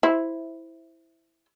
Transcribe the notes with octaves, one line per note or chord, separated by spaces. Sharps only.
E4 C5